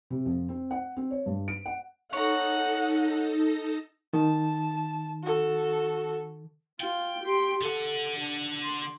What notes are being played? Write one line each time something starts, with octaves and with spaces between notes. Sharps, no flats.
C3
F2
C4
F#5
C4
C#5
G2
D7
F#5
D#4 A4 C#5 F#5 A#5 A#6
D#3 A5
F#4 A4
F4 G5
G4 C6
D3 A4 F#5
D4
C6